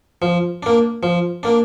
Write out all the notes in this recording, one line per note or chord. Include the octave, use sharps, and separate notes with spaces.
F3
A#3 D4
F3
A#3 D4